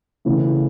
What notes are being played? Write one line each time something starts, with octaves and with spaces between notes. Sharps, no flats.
C#3 E3 A3